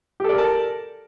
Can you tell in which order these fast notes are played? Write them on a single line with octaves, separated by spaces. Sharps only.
G4 A4 D5 A#4 A5